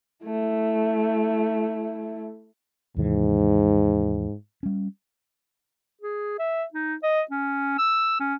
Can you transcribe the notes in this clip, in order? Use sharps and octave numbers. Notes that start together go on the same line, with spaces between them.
A3 E4
D#2 G#2 C3 E3
G3 C#4
G#4
E5
D#4
D#5
C#4
E6
C#4